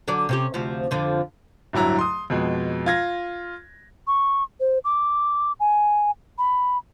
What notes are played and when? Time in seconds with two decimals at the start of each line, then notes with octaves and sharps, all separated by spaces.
0.08 D3 F#3 D5
0.29 C3 C#4 G4
0.54 D2 C3 F3
0.91 F2 D3 F3
1.73 D1 G2 F#3 E4 A#5
1.99 C6 D#6
2.30 F2 B2 G#3
2.86 F4 G#6 A#6
4.07 C#6
4.60 C5
4.84 D6
5.60 G#5
6.38 B5